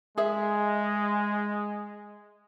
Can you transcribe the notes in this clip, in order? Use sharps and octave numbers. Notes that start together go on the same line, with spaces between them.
G#3 G#4 E5